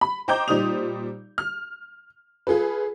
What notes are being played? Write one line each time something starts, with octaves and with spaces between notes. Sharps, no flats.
B5
C5 D#5 G5 A#5 D6 G6
A#2 G3 D#4 C5 D#6 F7
F6
F4 G#4 A4 B4